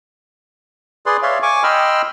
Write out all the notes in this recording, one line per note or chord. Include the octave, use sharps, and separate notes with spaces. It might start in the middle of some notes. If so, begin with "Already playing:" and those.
G#4 B4 D5 C6
C#5 D5 E5 F5 C6
G#5 C#6 D6
D#5 G5 B5 C6 E6 F6